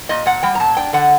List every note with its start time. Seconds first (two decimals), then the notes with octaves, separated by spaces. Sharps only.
0.09 A#2 D#5
0.26 A#2 F#5
0.43 G3 G5
0.55 A#5
0.60 A#2 A5
0.77 D4 G5
0.93 D3 F#5